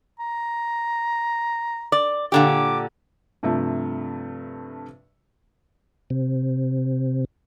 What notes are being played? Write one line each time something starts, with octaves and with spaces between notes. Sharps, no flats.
A#5
D5
A#2 D3 G4 D6
G2 C3 F3 A3
C3